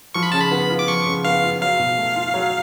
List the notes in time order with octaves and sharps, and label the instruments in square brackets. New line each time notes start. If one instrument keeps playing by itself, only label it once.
[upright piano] F3 [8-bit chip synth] C#6
[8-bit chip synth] B5
[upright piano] C#3 [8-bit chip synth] A5
[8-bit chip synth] B5
[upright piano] B3
F4
[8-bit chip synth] D6
[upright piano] F3 [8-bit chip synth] C#6
[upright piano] C#3
[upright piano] B3 [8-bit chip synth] F5
[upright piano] F4
[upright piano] F#3 [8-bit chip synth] F5
[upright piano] B2
A3
F4
F#3